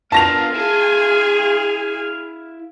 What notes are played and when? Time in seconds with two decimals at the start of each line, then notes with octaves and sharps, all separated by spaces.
0.12 B3 D4 F4 A#4 A5 F6 A#6 F7
0.55 E4 G#4 F5 G#5